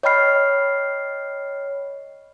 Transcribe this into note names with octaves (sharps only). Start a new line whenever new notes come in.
C#5 D#5 G5 B5 F6 C7